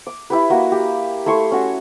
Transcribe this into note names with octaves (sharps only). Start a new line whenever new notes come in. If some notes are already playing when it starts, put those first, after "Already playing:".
D6
E4 G4 B4
A#3 F#4
G4
A3 E4 C6 C#6
C#4 F#4 G#5